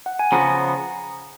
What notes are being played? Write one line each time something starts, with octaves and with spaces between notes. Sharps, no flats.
F#5
G#5
C#3 F3 B3 F#4 A#5